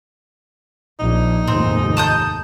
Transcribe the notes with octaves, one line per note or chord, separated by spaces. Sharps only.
A#1 D#4
F1 D#2 G#2 C4
A5 D#6 G6